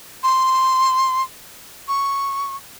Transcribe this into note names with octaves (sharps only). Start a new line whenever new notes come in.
C6
C#6